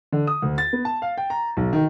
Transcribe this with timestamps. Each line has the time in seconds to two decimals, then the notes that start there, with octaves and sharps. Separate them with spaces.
0.12 D3
0.27 D#6
0.42 D2
0.58 A6
0.73 B3
0.85 A5
1.02 F5
1.17 G5
1.30 A#5
1.57 B1
1.73 D#3